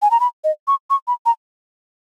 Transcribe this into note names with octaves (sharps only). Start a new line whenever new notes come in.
G#5
A#5
B5
D#5
C#6
C#6
B5
A#5